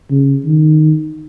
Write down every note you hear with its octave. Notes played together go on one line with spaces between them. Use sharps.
C#3
D#3